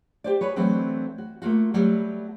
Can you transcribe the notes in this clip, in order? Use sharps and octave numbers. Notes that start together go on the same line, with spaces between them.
G4 C5 D5
F#4 G#4 B4 C#5
E3 F#3 A3 C4 D4
F#4
A3 A#3 F4 F#4
F#3 G3 A3 B3